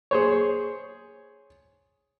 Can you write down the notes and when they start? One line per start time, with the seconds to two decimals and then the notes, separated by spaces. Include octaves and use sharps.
0.11 G#4 C5 C#5